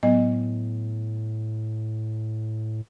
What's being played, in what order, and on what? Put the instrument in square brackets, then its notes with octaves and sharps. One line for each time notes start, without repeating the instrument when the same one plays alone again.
[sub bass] A2 [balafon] F#3 B3 D#5